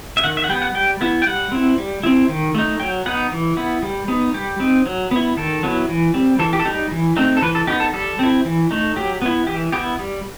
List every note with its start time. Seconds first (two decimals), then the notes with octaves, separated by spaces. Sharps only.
0.17 E5
0.24 D#3 F#5
0.37 E5
0.44 F#5
0.49 G3 G5
0.52 B3
0.62 F#5
0.75 G3 G5
1.01 B3 E4
1.22 G5
1.26 G3 F#5
1.52 C4 E4
1.78 G3
2.04 C4 E4
2.29 D#3
2.55 A3 D#4
2.80 F#3 G5
3.06 B3 D#4 F#5
3.32 E3
3.57 B3 E4
3.82 G3
4.08 B3 D#4
4.34 G3 G4
4.60 C4 D#4
4.86 F#3
5.11 B3 E4
5.37 D#3 A4
5.63 F#3 B3 E4
5.89 E3
6.14 G3 C4
6.39 E3 A4
6.53 G4
6.60 A4
6.65 G3 D#4 G4
6.91 E3
7.17 A3 C4 D#4
7.37 A4
7.42 E3 B4
7.55 A4
7.67 D#4 G4
7.70 B3
7.80 A4
7.93 G3 A4
8.19 C4 E4
8.45 E3
8.71 A3 D#4
8.96 F#3 G4
9.22 B3 E4
9.47 E3 G4
9.72 B3 E4 G4
9.99 G3